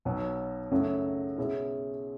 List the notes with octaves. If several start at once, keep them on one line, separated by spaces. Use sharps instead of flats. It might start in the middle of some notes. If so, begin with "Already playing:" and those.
B1 B2 F#3
F#2 C#3 F#3 A3 E4
B2 G#3 C#4 E4